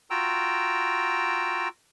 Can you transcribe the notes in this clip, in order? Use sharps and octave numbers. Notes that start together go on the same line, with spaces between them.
F4 F#4 G5 A#5 E6